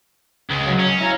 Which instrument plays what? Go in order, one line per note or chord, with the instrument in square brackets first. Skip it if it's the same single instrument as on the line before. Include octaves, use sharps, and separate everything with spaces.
[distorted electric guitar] C#2 G#3
[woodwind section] F#3
[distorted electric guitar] C#4
[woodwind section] E4 F5 A#5